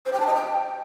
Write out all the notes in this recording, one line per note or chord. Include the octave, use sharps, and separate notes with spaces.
C5
G5
A5
D#5
G5